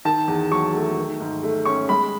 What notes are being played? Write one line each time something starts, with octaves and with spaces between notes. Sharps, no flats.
D#3 A5
E2
F#3 C#6
A3
D#3
G#2
A3
C#4 C#6
G#3 B5